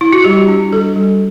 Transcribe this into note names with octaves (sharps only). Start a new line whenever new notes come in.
E4
F#4
G3 G4
D4
G3 A4
G3